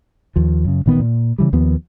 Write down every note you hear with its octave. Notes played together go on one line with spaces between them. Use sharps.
D#2 F3
F#2 C#3
A1 A#2 D#3 B3
A#2
C#3 E3 G3
D#2 F3 B3